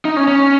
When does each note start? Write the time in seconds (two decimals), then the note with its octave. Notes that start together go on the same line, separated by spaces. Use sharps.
0.05 D#4
0.17 C#4
0.28 C#4